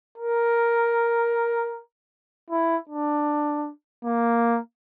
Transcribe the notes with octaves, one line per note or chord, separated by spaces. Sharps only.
A#4
E4
D4
A#3